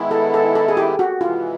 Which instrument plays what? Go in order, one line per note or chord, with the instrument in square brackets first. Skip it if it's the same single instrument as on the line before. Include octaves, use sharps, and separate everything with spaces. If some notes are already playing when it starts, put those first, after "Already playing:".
Already playing: [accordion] D#3 G#3 B3 E4
[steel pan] A4
A4
A4
G#4
G4
F#4
[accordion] E2 C3 E3 G#3 B3 [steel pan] F4